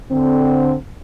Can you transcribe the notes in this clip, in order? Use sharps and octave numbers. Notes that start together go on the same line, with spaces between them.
D3 C4